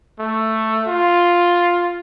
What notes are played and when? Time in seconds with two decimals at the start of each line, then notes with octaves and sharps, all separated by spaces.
0.19 A3
0.87 F4